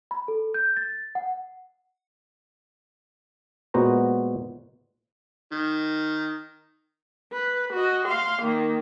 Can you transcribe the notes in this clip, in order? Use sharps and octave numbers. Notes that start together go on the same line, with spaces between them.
B5
A4
G6
A6
F#5
A#2 G#3 B3 F#4 C5 A#5
D#3
B4
F#4 D#5
F5 C6
D#3 A#3